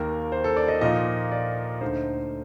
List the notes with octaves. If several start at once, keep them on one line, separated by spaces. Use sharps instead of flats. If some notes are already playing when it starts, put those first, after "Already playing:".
Already playing: D#2 D#3 A#3 A#4
C5
A4
D5
D#5
A#2 F3 A#3 D#4 D#5
D5
D2 D3 A3 D#4 C5